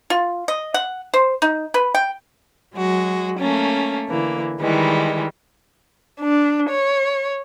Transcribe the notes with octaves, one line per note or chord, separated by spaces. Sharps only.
F4
D#5
F#5
C5
D#4
B4
G5
F#3 G#3 F#4
A3 A#3 C#4
D3 E3 A#3
D#3 E3 G3 G#3
D4
C#5